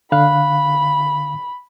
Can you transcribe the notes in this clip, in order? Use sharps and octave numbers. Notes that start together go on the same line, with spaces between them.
D3 F5 B5 F#6